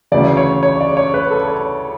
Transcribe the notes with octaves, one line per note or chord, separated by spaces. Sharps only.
D2 C#3 E3 D5
C#5
C#5
D5
C#5
B4
A4
C#5